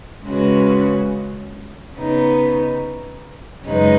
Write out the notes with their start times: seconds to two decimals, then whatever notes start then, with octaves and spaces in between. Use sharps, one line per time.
0.24 C#3 G#3 C#4 F#4 B4
1.95 C#3 B3 D#4
3.65 F#2 C#3 G#3 D#4 B4